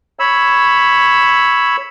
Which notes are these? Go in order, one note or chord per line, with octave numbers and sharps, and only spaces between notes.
C#5 B5 E6